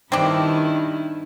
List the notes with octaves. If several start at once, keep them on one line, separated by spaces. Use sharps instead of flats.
G2 D#3 C4 D4 E4